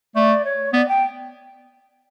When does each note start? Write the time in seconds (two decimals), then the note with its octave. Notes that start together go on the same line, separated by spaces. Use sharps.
0.15 A3 D5
0.45 C#5
0.73 B3 D5
0.88 G5